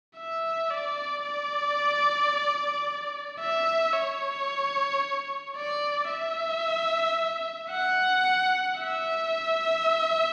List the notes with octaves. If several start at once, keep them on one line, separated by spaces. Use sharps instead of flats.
E5
D5
D5
E5
C#5
D5
E5
F#5
E5